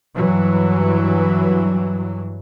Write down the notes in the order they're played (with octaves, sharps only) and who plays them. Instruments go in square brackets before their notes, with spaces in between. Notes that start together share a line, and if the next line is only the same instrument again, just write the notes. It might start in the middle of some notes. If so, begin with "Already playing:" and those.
[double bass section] G2 E3 F#3